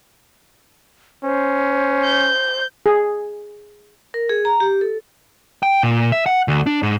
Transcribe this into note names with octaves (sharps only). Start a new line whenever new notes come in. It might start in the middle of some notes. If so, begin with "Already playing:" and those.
C#4 C5
G6
G#4
A#4
G#4
A#5
G4
A4
G5
A#2
E5
F#5
D2
D4
G#2